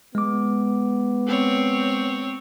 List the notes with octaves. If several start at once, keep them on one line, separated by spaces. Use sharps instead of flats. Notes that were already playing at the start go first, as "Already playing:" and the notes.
G#3 B3 D6
C4 C#5